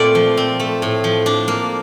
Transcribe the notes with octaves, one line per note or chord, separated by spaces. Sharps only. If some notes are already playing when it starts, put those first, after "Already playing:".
Already playing: A#2 A3 C4 D5
F3
C4
A3
A2
F3
D4
A#3